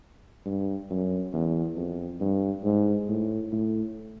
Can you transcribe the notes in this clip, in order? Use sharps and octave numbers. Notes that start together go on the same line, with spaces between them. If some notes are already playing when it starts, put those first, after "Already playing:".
G2
F#2
E2
F2
G2
G#2
A2
A2